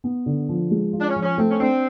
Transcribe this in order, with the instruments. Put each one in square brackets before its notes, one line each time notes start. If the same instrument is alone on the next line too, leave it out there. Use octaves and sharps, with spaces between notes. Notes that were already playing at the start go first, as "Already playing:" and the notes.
[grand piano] B3
D3
F3
G#3
F4
[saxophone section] D4
C#4
[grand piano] F3
[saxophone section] C#4
[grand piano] A3 [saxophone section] C4
[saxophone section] C#4
[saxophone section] C4 [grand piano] D4